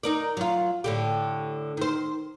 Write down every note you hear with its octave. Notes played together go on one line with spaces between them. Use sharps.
D#4 A#4 D5
F#3 F4
A2 D3 G4
D#3 C5